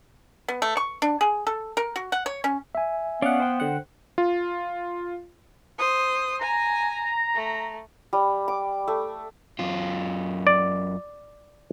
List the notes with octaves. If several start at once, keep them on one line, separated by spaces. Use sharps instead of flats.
B3
A3
C#6
D4
G#4
A4
A#4
F#4
F#5
C#5
C#4
E5 G#5
B3 C#4 C#5 D5 F5 F#5
C5 G5
D3 F#5
F4
C5 D#6
G#5 A#5
A3
G3
D6
A3
F#2 F4
D5